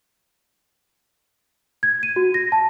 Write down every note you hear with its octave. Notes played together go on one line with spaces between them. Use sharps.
G#6
D#7
F#4
A#6
A5